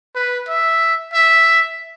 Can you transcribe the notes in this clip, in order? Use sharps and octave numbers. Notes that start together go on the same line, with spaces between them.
B4
E5
E5